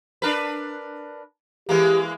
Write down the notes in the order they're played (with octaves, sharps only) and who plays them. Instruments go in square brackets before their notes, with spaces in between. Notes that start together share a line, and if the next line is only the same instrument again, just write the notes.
[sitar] D4 A#4 B4
[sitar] E3 G#3 A#3 [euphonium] G4